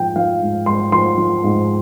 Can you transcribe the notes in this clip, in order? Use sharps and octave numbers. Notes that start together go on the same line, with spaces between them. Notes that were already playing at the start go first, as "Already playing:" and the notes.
Already playing: G#2 F3 G5
F3 F5
G#2
G#2 C6
F3 C6
F3
G#2